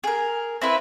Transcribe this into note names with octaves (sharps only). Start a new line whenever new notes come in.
G#4 A#4
C4 E4 B4 E5